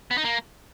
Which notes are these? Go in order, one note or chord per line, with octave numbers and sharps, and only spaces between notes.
B3
D#4
A#3